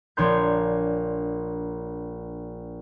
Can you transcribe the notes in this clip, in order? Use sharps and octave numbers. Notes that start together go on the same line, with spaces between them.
A#1 D4 C#5 C6 G6